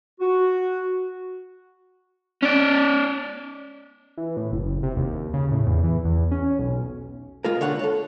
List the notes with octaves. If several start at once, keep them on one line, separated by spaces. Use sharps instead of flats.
F#4
C#4 D5
E3
A2
F#1
C3
D#2
C#3
A2
E2
E3
E2
C#4
B1
G#3 F4 A#4
D3 C#5 F#5
A4 C#5